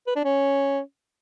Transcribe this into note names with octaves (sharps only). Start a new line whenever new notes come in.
B4
D4
C#4